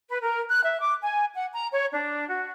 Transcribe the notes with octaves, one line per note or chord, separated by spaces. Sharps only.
B4
A#4
F#6
E5
D6
G#5
F#5
A#5
C#5
D4
F#4